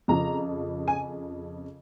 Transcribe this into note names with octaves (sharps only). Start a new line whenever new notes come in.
F2 C#3 F3 A#5
G#5